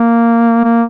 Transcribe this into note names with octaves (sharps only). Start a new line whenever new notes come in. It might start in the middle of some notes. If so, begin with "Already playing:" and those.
Already playing: A#3
A#3